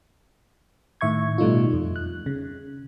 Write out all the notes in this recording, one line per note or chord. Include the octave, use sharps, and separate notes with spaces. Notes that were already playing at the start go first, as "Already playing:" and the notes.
A2 D#3 E5 C#6 G#6
B2 G3 A3 D#4 F4
F2
F#6
C#3